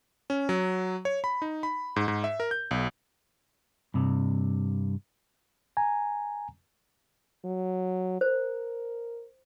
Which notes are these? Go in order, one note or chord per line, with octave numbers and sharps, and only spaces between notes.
C#4
F#3
C#5
B5
D#4
B5
G#2
G#2
E5
A#4
G6
B1
G2 C3
G#5 A#5
F#3
A#4 C5